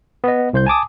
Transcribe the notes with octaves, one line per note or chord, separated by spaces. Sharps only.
B3 D#5
C2 C5 G6
G#5 A5 D6 D#6